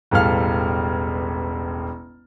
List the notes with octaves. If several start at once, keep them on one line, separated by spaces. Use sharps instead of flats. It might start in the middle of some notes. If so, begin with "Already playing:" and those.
E1 A1 G3 A4 F5 F6